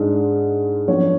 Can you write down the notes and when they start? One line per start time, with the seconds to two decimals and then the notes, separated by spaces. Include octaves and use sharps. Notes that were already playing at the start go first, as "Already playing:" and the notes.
Already playing: G#2 G#3 D4
0.88 F#2 F3 B3 D4 C#5